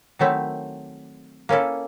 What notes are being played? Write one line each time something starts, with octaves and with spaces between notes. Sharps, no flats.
D#3 F#3 A3 C4 E4
A#3 C#4 E4 A4